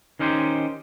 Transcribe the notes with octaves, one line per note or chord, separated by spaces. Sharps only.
D#3 C#4 D#4 G4 C5